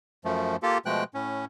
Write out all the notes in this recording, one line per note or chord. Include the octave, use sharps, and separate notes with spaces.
F#2 F3 A3
A#3 F4 G4 A4
B2 F3 G#3 A3 G5 F#6
A2 C#4